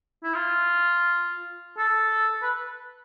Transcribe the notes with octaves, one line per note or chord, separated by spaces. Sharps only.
E4
F4
A4
B4